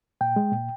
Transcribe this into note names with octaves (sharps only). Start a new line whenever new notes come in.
A#2 G5
G#3
A#2